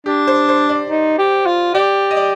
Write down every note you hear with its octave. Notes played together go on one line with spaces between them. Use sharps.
D4 G4
C5
C5
D5
D#4
G4
F4
G4 D5
D#5
D5